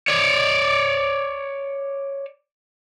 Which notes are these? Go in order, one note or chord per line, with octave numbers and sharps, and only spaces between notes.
C#5 D5